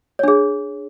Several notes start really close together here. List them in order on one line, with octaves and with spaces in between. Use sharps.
C#5 D4 G#4